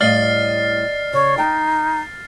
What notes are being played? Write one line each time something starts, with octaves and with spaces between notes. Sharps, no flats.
A2 G3 D5 D#5 F5 F6 A6 C7
C#3 C#5
D#4 G5 A5